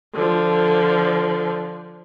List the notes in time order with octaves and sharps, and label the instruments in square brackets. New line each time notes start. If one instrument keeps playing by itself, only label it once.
[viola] D3 F3